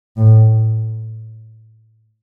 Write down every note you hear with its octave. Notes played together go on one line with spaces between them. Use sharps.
A2